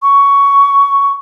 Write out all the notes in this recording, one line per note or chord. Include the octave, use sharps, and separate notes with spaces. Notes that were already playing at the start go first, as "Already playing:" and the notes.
C#6